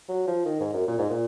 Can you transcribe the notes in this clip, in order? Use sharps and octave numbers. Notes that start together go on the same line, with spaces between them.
F#3
F3
D#3
G#2
F#2
A#2
G#2
A#2